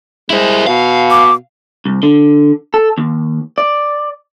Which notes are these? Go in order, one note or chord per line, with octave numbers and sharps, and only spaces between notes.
G#3 E4 C5
B2 F5
D6
C2
D3
A4
D#2
D5